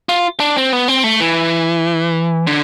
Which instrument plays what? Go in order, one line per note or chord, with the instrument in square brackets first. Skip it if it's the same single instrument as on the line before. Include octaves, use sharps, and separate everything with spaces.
[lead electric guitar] F4
D4
C4
B3
C4
A3
E3
D3